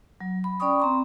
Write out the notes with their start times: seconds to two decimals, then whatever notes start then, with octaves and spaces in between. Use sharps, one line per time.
0.20 F#3
0.44 B5
0.60 C#4 D5 G5 B5 C#6 D#6
0.80 C4 A#5 C6